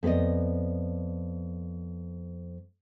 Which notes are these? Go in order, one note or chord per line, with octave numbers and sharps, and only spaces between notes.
F2 B3 A4 D5 D#5